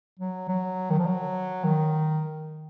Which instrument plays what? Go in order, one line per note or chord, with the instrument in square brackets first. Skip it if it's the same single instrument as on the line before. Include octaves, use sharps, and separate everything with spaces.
[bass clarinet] F#3
F#3
D#3
F3
F#3
D#3